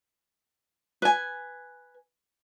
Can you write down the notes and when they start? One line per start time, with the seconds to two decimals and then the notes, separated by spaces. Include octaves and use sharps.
1.02 B4 G#5